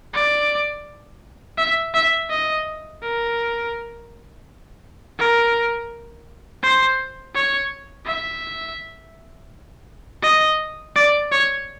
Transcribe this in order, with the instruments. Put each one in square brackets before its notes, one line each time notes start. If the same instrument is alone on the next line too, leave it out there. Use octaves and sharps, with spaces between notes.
[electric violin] D5
E5
E5
D#5
A#4
A#4
C5
C#5
E5
D#5
D5
C#5